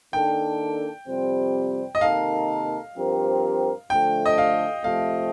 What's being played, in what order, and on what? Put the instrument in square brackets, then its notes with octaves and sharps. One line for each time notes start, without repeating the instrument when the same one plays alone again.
[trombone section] D#3 A#3 D4 A4 [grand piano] G5
[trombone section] F2 C3 G3 C4
[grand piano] D#5
[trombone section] C3 D#3 A#3 D#4 A4 [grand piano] F5
[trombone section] G2 F3 C4 G4 A#4
[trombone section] D3 F3 A3 [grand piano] G5
[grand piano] D#5
F5
[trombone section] F2 C3 F3 A3 [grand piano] F5